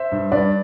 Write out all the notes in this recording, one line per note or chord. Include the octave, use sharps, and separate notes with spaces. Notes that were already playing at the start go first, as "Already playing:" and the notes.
Already playing: C5 E5
G2
G2 B4 D5